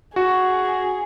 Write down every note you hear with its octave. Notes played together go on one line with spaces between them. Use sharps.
F#4 G#4